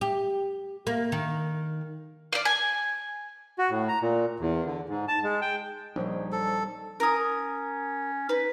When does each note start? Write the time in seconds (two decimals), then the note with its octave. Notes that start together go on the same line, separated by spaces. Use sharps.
0.01 G4
0.87 A#3
1.12 D#3
2.33 D5 F5
2.45 G#5
3.58 F#4
3.70 A2
3.88 A#5
4.02 A#2
4.40 E2
4.66 D3
4.89 G#2
5.08 A5
5.23 G#3
5.42 G5
5.96 A#1 G3 D#4 C5 C#5
6.32 A4
7.00 C#4 A#4 D#6
8.29 D#4 B4